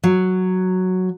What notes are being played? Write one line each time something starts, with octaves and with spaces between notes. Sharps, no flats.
F#3